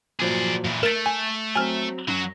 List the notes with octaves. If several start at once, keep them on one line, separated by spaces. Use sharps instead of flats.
A#2 F3 F#3 G#4 D5
A#2 E3
A3 A#4 A6 B6 D7 E7
G#5
F#3 C4 G#5 F6
F#2 F#3